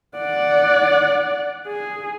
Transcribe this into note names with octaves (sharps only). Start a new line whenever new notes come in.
D5 F#5
G#4